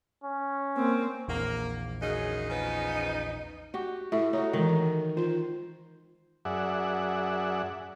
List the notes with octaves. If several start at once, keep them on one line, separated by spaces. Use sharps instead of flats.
C#4
A#3 C4
A#1 E2 A#3
F#2 C#3 D#4
C#3 F3 B3
F#4 G4
A2 E5
D#4 F#4 C#5
D#3 E3 G#3
F4 C5
F#2 G#4 D5 E5 F#5